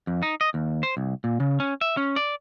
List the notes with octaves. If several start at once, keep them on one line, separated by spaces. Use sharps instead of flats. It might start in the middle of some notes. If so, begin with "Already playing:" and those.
F2
D#4
D#5
D#2
C5
C2
A#2
C#3
C#4
E5
C#4
D5